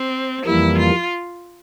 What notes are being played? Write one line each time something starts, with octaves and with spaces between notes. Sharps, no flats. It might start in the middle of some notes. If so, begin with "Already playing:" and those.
Already playing: C4
F2 E3 G3 A#3 E4
F4